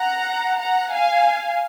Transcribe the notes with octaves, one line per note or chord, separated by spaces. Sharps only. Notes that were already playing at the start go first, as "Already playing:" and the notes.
Already playing: F#5 A#5
F#5 A#5
F5 G#5